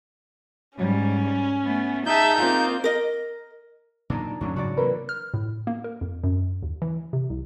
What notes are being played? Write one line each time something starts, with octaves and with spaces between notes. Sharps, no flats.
G#2 G3 C#4
A3 B3
D#4 G#4 E5 A5 G6
A#3 C4 F4
A#4 D#5
A#2 F#3 D4 D#4
F2 A2 F#3 C#4 D4
G#2 C#3 F#3 F#4 D5
C3 E3 A#3 A#4 B4
F6
A2
A#3
A#4
F2
F#2
D#2
E3
C3
C2